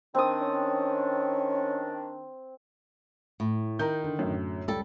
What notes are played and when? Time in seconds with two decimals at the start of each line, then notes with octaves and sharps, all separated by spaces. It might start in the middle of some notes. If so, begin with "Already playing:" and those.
0.15 D#3 C4 D4 D#6
0.41 C#4
3.40 A2
3.79 D#3 A#5 G6
4.04 D3
4.19 F#2 A2 D3
4.68 C#2 G3 A4